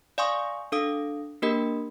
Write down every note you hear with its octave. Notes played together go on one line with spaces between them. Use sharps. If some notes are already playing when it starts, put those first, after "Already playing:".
D5 F5 G#5 C6 C#6 D#6
D4 A4 F5 D#6 D7
A#3 D4 G4 A#4 D#5 B5